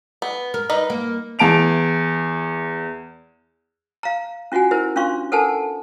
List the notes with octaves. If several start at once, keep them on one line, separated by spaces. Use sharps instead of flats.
B3
A#4
D#4 B4 D#5
A#3
E2 A5 D7 F7
F5 A#5
C#4 F4 F#4 F#5 G#5
E4 A#4 C5
C#4 D4 F4 F5 C6 C#6
A4 A#4 C5 F#5 G#5 A5